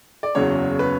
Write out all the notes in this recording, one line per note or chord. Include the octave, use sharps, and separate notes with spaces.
D5
F#1 E2 C#3 F#3 C#5
B4